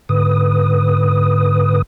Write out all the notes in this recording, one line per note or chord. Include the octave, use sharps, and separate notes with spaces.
G#2 D3 B4 D#6